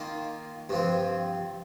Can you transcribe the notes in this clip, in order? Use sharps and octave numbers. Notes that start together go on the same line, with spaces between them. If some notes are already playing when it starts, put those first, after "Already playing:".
Already playing: D#3 A#3 F4
G2 F3 C4